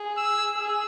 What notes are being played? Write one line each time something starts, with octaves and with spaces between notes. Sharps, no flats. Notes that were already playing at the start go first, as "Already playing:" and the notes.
Already playing: G#4
E6
G#4 E6